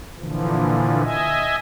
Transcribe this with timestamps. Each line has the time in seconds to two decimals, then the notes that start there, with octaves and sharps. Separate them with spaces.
0.17 A#2 D3 E3 F3
1.03 D#5 E5 G#5